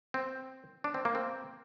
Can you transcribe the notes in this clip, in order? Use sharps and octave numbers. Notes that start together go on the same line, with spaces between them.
C4
D4
C4
A#3
C4